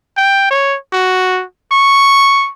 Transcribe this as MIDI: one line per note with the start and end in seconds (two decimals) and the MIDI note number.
0.17 0.51 79
0.51 0.77 73
0.93 1.44 66
1.72 2.50 85